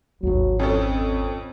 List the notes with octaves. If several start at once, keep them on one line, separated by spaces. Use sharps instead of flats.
G#1 D#2 F#3
F2 C4 C#4 A4